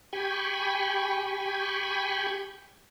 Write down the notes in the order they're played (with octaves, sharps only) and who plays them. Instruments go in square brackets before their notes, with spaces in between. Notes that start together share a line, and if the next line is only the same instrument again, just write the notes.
[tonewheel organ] G4 G5 G#5 B5 C#6